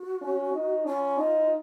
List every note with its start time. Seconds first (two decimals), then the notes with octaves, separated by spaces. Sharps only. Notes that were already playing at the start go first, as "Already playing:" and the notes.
Already playing: F#4
0.21 C#4
0.53 D#4
0.85 C#4 F4
1.18 D#4